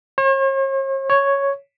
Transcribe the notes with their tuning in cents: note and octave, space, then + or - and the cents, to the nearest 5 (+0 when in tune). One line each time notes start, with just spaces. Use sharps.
C#5 -45
C#5 +0